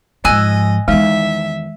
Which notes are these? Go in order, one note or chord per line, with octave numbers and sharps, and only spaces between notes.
G#2 F3 D#5 G#5 E6 F#6
E2 D#3 G#3 E5